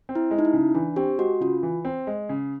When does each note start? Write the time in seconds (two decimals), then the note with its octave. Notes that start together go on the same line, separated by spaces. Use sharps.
0.09 C4
0.15 E4
0.31 G#3
0.39 D#4
0.45 E4
0.53 C#3
0.75 E3 D4
0.96 C4 G4
1.18 G#3 F#4
1.40 C#3 F4
1.63 E3
1.85 C4
2.07 G#3
2.29 C#3